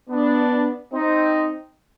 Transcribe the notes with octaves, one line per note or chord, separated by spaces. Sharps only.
B3 D4
C4 D#4